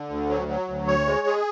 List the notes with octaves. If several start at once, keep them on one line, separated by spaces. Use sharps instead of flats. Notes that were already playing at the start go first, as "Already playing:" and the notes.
Already playing: D3
D2
F#3
F#3
D2
C#5
G#3
G#4